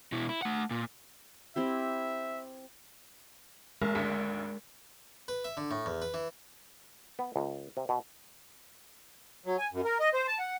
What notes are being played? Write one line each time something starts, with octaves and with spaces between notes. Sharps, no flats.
B2 E4
E4
A3 F#5
A#2
C4 E4 G4 E5
A1 G#3 A#4
G#1 D2 B6
B4
E5
D3
A2
E2
B4
E3
B3
C#2
C3
B2
F#3
G#5
F#2
A#4
D#5
C5
A5
F#5